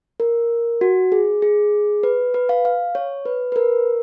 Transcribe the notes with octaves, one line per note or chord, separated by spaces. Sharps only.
A#4
F#4
G#4
G#4
B4
B4
F5
F5
C#5
B4
B4
A#4